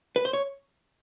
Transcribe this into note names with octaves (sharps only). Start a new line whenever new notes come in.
B4
C5
C#5